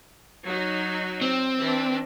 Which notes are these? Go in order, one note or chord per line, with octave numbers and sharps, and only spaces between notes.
F#3 D#4 F#4
C4
E3 D4